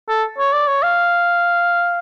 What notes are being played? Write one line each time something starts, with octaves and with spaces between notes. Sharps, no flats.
A4
C#5
D5
C#5
F5